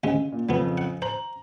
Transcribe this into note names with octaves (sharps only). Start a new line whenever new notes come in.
D2 C#3 G#3
A#2
F2 C#3 F#3 B3
F#5
C5 A#5 F#7